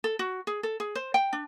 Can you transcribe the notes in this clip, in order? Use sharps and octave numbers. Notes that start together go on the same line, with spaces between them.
A4
F#4
G#4
A4
G#4
C5
G5
D4